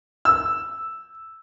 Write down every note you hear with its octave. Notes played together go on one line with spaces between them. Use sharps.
E6